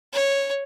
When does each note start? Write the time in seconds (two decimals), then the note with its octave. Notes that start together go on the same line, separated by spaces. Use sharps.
0.13 C#5